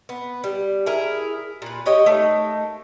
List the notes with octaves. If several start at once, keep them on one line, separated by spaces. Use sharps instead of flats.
B3
G3
E4 G#4 A#4
A#2 B4
G4 C#5 D#5
A3 D#4 A#4